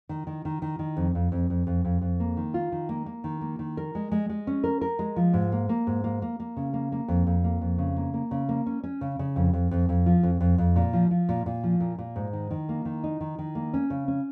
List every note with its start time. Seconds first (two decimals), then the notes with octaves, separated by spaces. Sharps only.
0.09 D#3
0.27 D#3
0.45 D#3
0.62 D#3
0.79 D#3
0.97 F2
1.15 F2
1.32 F2
1.50 F2
1.67 F2
1.84 F2
2.01 F2
2.20 A#3
2.37 D#3
2.54 F4
2.72 D#3
2.89 A#3
3.06 A#3
3.24 D#3
3.41 A#3
3.59 D#3
3.77 A#4
3.95 G#3
4.12 G#3
4.29 G#3
4.47 C#4
4.64 A#4
4.81 A#4
4.99 G#3
5.16 F3
5.34 G#2
5.52 A#3
5.69 A#3
5.87 G#2
6.04 A#3
6.22 A#3
6.40 A#3
6.57 C#3
6.73 A#3
6.92 A#3
7.08 F2
7.27 F2
7.44 A#3
7.61 F2
7.78 C#3
7.97 A#3
8.14 A#3
8.31 C#3
8.49 A#3
8.66 C#4
8.84 C#4
9.01 C#3
9.19 C#3
9.36 F2
9.53 F2
9.71 F2
9.89 F2
10.06 F3
10.23 F2
10.41 F2
10.58 F2
10.76 A#2
10.93 F3
11.11 F3
11.29 A#2
11.46 A#2
11.63 F3
11.80 A#2
11.99 A#2
12.16 G#2
12.33 D#3
12.50 D#3
12.69 A#3
12.85 D#3
13.04 D#4
13.20 D#3
13.39 D#3
13.55 A#3
13.74 C#4
13.90 C#3
14.08 C#4